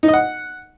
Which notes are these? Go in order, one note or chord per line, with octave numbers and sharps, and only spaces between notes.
D#4
D#5
F#5